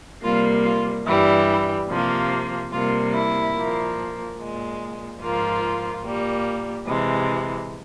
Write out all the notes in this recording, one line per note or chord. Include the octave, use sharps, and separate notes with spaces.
C3 G3 A#3 F4
F4
G2 E3 G3 E4
C3 F3 A#3
C3 G3 A#3 F4
E4
A#2 F3 A#3
A#2 G#3
G#2 F3 A#3 F4
A#2 G3 A#3
C3 E3 G#3